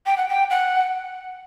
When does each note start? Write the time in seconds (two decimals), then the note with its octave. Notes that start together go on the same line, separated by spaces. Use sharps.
0.06 G5
0.17 F#5
0.28 G5
0.50 F#5